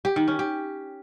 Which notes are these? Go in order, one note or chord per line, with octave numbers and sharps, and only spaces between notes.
G4
D#3
C#4
G4